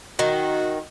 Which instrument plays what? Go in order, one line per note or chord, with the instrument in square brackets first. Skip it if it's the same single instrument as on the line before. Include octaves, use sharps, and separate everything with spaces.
[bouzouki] D#3 [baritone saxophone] F#4